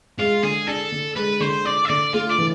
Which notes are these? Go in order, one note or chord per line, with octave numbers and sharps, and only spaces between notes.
G#3 F4
D3 G#4
D4 A4
D3
G#3 B4
D3 C5
D4 D5
E5
D3 D5
A3 F4
D5
E3